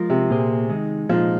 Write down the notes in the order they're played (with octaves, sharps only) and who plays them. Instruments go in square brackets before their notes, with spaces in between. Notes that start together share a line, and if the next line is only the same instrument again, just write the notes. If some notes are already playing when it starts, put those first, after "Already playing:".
Already playing: [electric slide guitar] F3 G#3 F4 A#4
[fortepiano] C3
[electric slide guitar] A#2 A#3 G#4 C5
D#3 G#3 D#4
[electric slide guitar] A#2 G#3 D#4 [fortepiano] F3